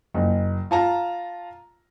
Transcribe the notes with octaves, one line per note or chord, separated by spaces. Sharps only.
F#1
F4 A5 A#5